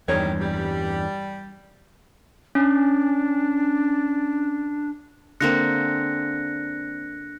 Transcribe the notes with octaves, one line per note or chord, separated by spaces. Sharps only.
E2 G2 D#3 G3 C#5
G3
C#4 D4
D3 A#3 C4 F#6 A#6 C#7